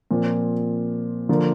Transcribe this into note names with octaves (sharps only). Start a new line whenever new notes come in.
A#2 F3 C4
D3 F3 A#3 F4